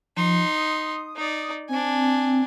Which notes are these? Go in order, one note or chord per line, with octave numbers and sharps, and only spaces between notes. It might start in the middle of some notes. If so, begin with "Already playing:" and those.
F3 D#4 C6
D#6
D#4 D5
C4 D4 G#5